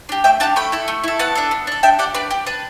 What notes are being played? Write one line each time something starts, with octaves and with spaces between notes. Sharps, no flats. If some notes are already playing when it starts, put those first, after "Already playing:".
D4 G4
A3 E5 G5
D4 G4 F#5 A5
A3 G5 B5
E4 A4
A3
E4 A4
B3 F#5 A5
D4 A4
B3
D4 A4
D4 E5 G5
G4 D5 F#5
D4 B4 D5
G4
D4 B4